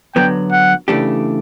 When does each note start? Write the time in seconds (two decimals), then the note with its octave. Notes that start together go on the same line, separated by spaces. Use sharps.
0.16 D3 F#3 B3 G5
0.52 F#5
0.88 C#3 E3 A3 D4 G4